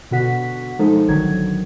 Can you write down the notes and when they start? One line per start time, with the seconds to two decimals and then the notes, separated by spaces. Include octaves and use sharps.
0.11 B2 D3 F#4 F#5 B6
0.79 F3 G#3 D#4 A4
1.08 A1 D3 D#3 F#3 G#6